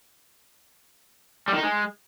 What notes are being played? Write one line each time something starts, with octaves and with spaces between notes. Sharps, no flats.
G3
D#3
D#4
G#3